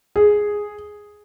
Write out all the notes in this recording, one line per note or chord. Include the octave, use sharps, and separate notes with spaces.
G#4